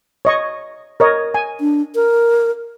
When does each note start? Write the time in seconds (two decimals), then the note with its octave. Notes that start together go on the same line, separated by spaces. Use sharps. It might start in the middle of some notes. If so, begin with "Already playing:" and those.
0.25 C#5 D#5 C#6
1.00 A#4 C#5 D#5
1.34 G#5
1.60 D4
1.95 A#4